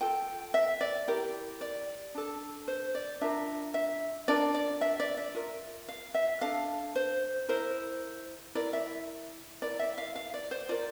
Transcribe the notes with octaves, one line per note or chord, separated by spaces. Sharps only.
F4 A4 G5
E5
D5
E4 G4 A#4
D5
D4 A4
C5
D5
D4 F4 A#4 E5
E5
D4 F4 A#4 D5
D5
E5
D5
E5
F4 A#4
F5
E5
D4 A4 F5
C5
E4 A#4 C5
E4 A#4 D5
E5
E4 A#4 D5
E5
F5
F5
D5
C5
F4 A#4 D5